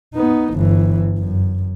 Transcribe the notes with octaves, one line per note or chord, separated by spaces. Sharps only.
B3 D#4
G1 E3
F#2